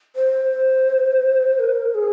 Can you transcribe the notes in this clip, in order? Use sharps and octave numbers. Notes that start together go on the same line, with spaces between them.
C5
A#4
G#4